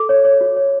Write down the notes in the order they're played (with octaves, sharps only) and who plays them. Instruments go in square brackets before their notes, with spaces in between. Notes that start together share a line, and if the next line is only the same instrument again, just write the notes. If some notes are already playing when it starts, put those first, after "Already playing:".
Already playing: [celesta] A4 D6
C#5
C#5
F#4
C#5